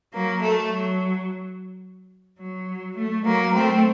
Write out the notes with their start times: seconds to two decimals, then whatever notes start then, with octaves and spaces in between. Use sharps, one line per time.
0.14 F#3 A#3
0.42 A3
0.70 F#3
2.41 F#3
2.98 A3
3.25 F#3 A#3
3.54 A3 C4